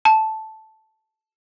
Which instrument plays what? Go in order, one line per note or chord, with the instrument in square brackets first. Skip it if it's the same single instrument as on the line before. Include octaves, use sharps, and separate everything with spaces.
[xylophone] A5